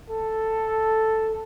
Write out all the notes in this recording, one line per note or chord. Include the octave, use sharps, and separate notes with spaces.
A4